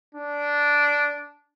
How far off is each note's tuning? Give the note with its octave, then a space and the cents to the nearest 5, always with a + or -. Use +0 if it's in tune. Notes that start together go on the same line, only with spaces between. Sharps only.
D4 -10